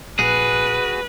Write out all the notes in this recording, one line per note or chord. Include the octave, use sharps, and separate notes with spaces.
A#1 F#4 G#4 B4